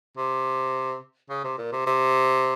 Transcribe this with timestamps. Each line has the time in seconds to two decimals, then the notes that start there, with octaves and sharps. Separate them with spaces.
0.17 C3
1.30 C#3
1.44 C3
1.58 A#2
1.72 C3
1.86 C3